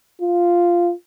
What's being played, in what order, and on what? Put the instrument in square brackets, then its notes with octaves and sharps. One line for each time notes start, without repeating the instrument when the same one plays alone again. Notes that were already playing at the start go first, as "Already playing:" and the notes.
[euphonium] F4